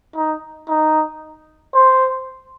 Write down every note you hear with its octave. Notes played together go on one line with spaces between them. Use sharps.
D#4
D#4
C5